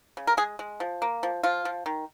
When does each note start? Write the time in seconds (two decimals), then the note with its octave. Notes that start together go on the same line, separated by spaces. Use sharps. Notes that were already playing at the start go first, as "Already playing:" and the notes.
0.17 C#3
0.27 A#4
0.37 G#3 G#4
0.59 G#3
0.80 F3
1.02 A#3
1.23 F3
1.43 F3 F4
1.65 F3
1.86 D#3